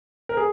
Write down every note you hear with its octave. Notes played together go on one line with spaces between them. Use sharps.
A#4
G#4